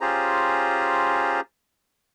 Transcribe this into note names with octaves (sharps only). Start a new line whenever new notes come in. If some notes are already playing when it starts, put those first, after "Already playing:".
C#4 F4 G4 G#4 C5 A#5